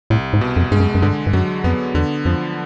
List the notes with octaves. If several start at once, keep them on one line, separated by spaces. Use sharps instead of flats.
C2 A2
G#2
B2
F2
G2 G#3
F#2
F#2
G2 D3
G2
F#2 F#3
F2 B3
E2 D3
F2 F3